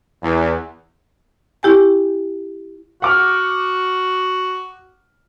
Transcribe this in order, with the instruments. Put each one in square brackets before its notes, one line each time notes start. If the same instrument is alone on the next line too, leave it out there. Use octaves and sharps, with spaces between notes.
[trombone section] E2
[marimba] E4 G4 G5 G#5
[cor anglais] F#4 [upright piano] F#5 D6 F6